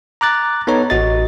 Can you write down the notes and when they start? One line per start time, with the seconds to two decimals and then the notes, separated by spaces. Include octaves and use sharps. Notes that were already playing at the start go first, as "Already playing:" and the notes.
0.21 A#5 D6 F#6 A6
0.67 B3 D#4 A4 B4 C#5 A#5
0.90 A1 F#4 D#5 A6